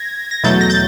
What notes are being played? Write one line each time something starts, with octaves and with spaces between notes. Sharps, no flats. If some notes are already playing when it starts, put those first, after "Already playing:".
Already playing: G#6 A#6
A#6
E2 B2 F#3 A3 G6 A6
A#6
G6 A6